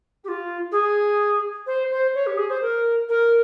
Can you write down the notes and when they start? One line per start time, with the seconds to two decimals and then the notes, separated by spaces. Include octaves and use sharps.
0.24 G4
0.28 F4
0.71 G#4
1.66 C5
1.90 C5
2.14 C#5
2.26 G4
2.37 G#4
2.49 C5
2.61 A#4
3.09 A#4